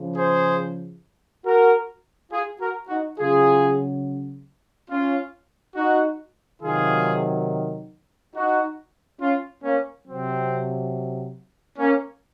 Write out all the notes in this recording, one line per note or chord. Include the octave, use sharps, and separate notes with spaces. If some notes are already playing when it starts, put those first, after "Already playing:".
Already playing: C#3 F3
G#4 C5
F#4 A#4
F4 G#4
F#4 A#4
D#4 F#4
C#3 F#3 F4 G#4
C#4 F4
D#4 F#4
C3 D#3 F#3 F4 G#4
D#4 F#4
C#4 F4
A#3 C#4
C3 F#3 C4
A#3 C#4